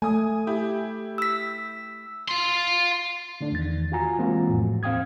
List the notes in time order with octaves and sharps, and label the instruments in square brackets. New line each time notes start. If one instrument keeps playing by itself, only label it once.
[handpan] A3 [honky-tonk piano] G#5 D#6
[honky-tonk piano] E4 G4
[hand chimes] E6 B6
[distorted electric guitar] F5 C6
[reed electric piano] D3 A3 D4
E2 D#3 A6
F4 F#4 G#5 A#5
E3 G#3 A#3 C4 F4 F#4
F2 A2
D#2 C4 F5 G5 D#6 G#6